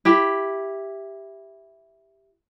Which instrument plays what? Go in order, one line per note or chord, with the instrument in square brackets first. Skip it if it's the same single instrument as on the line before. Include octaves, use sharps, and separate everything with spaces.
[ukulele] E4 G4